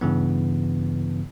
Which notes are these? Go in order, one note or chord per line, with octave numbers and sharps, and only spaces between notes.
G2 C#3 E3 B3